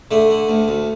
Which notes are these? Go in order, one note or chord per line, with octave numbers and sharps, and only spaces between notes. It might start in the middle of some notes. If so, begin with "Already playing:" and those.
D3 A3
D3
D2
D2